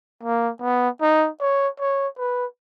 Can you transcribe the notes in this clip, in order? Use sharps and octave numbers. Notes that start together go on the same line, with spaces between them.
A#3
B3
D#4
C#5
C#5
B4